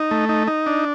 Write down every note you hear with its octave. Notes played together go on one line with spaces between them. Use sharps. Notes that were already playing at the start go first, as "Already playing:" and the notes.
Already playing: D#4
A3
D#4
D#4
D4